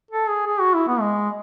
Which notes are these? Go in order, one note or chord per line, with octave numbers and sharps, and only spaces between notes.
A4
G#4
G#4
F#4
E4
B3
G#3